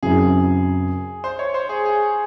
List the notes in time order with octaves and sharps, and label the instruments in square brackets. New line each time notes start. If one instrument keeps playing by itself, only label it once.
[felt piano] F#2 C#3 F#3 C4 E4 [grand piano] G#4
[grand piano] C5
C#5
C5
G#4
G#4